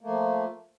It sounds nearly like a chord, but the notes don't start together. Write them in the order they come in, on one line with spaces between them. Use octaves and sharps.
A#3 A3 F3